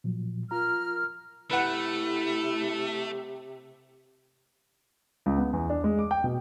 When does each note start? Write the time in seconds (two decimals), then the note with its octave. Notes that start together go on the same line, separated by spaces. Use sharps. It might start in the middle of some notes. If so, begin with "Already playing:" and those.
0.04 A#2 F3 F#3
0.51 F4 A#4 A#5 F6
1.51 C3 A3 E4 B4 F#5
5.26 C#2
5.38 B3
5.53 E2
5.70 D4
5.84 G#3
5.99 D6
6.11 G5
6.24 B2